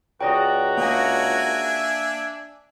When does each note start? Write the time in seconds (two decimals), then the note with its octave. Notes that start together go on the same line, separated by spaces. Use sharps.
0.21 C#2 F#4 G#4 D5 G5 A#5
0.77 A#3 D4 E5 G#5